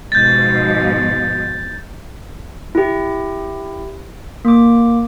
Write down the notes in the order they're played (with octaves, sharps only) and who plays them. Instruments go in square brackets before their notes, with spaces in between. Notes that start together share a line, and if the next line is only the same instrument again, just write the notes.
[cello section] G#2 B2 F3 [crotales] G6 A6
[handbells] E4 G4
A#3 D6